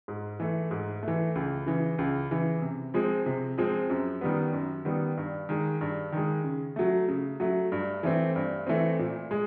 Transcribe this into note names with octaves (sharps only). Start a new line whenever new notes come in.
G#2
E3 A3
G#2
E3 A3
C#2
C#3 E3
C#2
C#3 E3
C3
F3 G#3 C4
C3
F3 G#3 C4
F#2
D#3 G3 B3
F#2
D#3 G3 B3
G2
D#3 G#3
G2
D#3 G#3
C#3
F#3 A3
C#3
F#3 A3
G2
E3 A3 C4
G2
E3 A3 C4
A#2
G#3